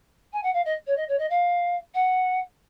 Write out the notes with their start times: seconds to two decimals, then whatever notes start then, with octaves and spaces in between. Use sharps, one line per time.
0.33 G#5
0.43 F#5
0.54 F5
0.66 D#5
0.87 C#5
0.97 D#5
1.08 C#5
1.19 D#5
1.30 F5
1.94 F#5